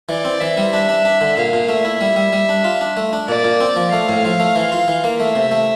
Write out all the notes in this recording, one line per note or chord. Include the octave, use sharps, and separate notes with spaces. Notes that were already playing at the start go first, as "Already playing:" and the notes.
E3 D5
C4
E3 E5
G3
D4 E5
D4
D4
D3
A#2 F5
A#2
A3 E5
E4
G3
G3
G3
D4
F4
D4
A3
D4
A#2 D5
A#2
C4
F3
A3 F5
A2
F3
A3
E3
F4
E3
A#3
A3 E5
C3
A3